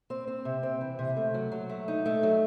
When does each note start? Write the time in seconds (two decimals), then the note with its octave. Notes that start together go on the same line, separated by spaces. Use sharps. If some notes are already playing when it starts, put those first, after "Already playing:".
0.10 C4
0.27 C4
0.45 C3
0.63 C4
0.81 E3
0.99 C3
1.16 A3
1.34 F#3
1.52 F#3
1.70 A3
1.88 D#4
2.06 A3
2.23 F#3